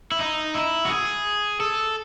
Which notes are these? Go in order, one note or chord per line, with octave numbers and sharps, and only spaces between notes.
E4
D#4
E4
F#4
G#4
A4